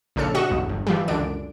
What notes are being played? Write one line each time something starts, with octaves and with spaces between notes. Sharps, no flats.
A#1 C#3 D4 A4 F6 C#7
C#3 F#4 D#5 F#5 C#6 E7
B1 E2 G2
G1
E3 F3 G3
C#2 F#2 D3 D4 D7